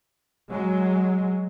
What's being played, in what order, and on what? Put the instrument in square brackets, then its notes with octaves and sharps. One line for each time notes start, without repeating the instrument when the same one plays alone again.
[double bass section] F#3 G#3